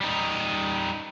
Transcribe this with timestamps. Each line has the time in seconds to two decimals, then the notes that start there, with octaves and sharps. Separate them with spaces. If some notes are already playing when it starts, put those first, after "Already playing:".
0.01 G3 D#4